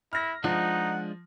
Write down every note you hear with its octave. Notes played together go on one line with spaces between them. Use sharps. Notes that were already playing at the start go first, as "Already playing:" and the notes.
E4 F6 A#6
F3 G#3 D4 D#4 F4 F#5